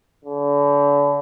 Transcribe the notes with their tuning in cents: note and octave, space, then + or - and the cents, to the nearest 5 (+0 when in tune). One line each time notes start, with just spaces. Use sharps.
D3 -40